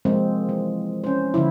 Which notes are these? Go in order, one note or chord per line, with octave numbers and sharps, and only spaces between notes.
F3 G#3 A#3 C4
E3
C#4 C5
D3 F3 E4